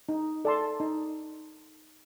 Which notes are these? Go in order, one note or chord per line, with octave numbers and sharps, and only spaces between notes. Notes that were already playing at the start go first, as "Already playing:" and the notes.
D#4
A4 D5 A5 C6
D#4